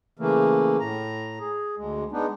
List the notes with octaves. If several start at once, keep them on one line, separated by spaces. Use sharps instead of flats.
C#3 E3 A3 A#3
A2 A#5
G#4
D2 G#3
G#3 B3 D4 D#4